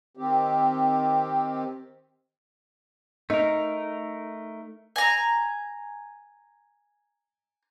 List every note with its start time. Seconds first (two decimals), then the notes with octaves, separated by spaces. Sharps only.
0.17 D#3 C4 G4
3.30 A3 D#4 A#4
4.96 G#5 A#5